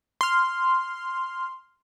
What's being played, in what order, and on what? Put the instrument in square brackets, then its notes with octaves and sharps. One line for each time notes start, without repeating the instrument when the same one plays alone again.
[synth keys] C6 F6